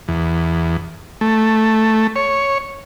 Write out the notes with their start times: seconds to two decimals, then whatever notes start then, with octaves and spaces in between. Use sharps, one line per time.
0.08 E2
1.21 A3
2.16 C#5